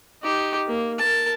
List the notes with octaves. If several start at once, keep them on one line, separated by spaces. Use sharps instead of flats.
D#4 G4
A#3
A#4 A5